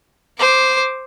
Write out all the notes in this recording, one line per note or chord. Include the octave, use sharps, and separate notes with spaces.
C5 D6